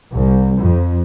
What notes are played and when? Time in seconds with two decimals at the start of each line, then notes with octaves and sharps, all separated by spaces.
0.14 C2
0.58 F2